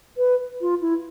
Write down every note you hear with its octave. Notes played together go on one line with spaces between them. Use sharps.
B4
F4
E4